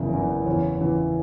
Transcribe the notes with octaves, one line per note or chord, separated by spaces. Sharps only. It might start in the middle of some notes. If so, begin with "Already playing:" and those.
Already playing: F#1 E2 C#3 E3 A#4
F#1 E2 C#3 E3
E2 C#3 E3 C#5
E2 C#3 E3